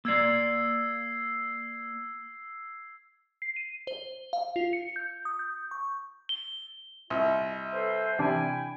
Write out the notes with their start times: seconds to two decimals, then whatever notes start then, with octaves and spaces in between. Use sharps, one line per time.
0.05 A#3 D5 E6 G#6 C7
3.42 C7
3.56 D#7
3.87 C5
4.33 F5
4.56 F4
4.73 C#7
4.96 G6
5.25 D#6
5.39 G6
5.71 C#6
6.29 G7
7.10 C2 F4 D#5
7.72 A4 B4 C5
8.19 C3 E3 D4 G5 G#5 B5